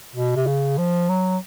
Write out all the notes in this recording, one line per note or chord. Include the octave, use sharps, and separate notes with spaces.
B2
C3
C#3
F3
F#3